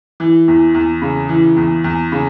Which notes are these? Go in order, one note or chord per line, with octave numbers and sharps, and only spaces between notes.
E3
E2
E2
C#3
E3
E2
E2
C#3